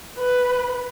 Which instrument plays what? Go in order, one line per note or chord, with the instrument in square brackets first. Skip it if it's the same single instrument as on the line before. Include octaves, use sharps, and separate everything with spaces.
[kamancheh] B4